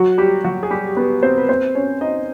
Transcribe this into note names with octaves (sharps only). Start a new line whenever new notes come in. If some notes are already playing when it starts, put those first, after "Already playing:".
Already playing: F#3 F#4
G3 G4
F#3 F#4
G#4
G3 G4
B3 B4
C4 C5
B4
C4 C5
C#4 C#5
D#4 D#5